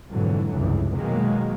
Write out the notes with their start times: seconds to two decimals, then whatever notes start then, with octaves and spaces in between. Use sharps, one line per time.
0.10 F2 G#2 B2 D3 E3 F#3
0.52 F1 C#2 G2 E3
0.96 B2 D#3 F#3 G#3 A#3